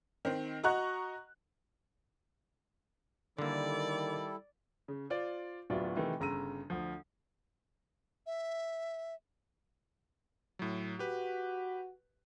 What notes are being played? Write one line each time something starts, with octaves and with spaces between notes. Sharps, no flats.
D#3 C4
F#4 D#5 F#5 A#5 C#6 F#6
D3 D#3 G3 A#3 E4 A4 D5
C#3
F4 C5 D5
D1 B3 F4 F#4 D5 E5
C3 D#3 E3 A3
G1 C#3 A#5 E6 D#7
D2 F3
E5
A2 F#3
F#4 G4 B4